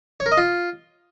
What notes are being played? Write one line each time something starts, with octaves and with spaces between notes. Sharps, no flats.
C#5
A#4
D#5
F4